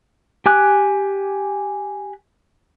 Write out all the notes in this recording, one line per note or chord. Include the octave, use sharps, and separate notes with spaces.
G4 G#5 D6 F#6